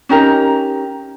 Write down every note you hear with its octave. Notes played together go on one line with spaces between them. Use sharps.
C#4 D#4 G4 A#4